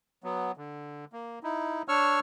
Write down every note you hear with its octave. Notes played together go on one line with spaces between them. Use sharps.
F#3 B3
D3
A#3
D#4 E4
D4 C#5 C#6 E6 F6